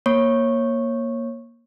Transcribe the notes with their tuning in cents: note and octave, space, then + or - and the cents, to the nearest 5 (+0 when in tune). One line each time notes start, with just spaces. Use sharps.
A#3 +5 C#5 -20 C#6 -10